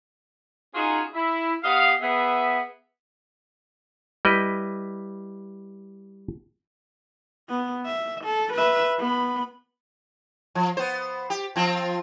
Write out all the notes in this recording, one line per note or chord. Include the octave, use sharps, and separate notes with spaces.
C#4 D#4 F4 F#4 G#4
E4
B3 G4 D#5 F5
B3 G#4 E5
G3 E4 B4 D#5
B3
E5
A4
B4 E5
B3 B5
F3
B3 C5
G4
F3 C4 F4